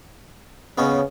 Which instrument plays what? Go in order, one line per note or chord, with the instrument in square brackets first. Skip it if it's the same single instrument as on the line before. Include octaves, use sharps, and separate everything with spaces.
[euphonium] C#3 [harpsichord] B3 C#4 D#5